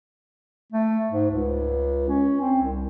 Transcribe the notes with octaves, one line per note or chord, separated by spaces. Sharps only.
A3
G#2
C#2
C#4
C4
C2